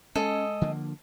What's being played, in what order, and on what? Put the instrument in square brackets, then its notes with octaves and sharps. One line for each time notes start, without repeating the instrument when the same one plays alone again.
[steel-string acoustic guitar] G#3 D#5 [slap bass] C#4 [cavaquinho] A4
[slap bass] D3 F3 A#3